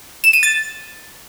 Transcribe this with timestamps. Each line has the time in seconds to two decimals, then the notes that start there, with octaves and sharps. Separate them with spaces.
0.24 E7
0.33 D#7
0.43 A6